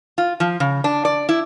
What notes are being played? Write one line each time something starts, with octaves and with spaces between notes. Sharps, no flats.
F4
F3
C#3
D4
D5
E4